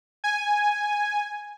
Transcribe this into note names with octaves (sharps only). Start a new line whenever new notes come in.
G#5